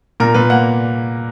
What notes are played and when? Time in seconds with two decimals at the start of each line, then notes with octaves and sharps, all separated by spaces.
0.20 A#2 A#4
0.34 A#2 B4
0.50 A#3 F#5